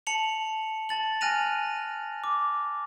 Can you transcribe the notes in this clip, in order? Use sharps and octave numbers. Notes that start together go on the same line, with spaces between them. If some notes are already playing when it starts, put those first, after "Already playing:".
A5 C#7 F7 F#7
A5 A6 F#7
G#5 F6 F#6 A#6 D#7 F7
D6